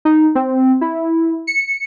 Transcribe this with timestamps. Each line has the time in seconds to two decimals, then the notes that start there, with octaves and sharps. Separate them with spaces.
0.05 D#4
0.35 C4
0.81 E4
1.47 C#7